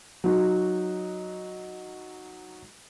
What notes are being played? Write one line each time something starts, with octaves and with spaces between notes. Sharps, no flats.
F#3 D#4 F#4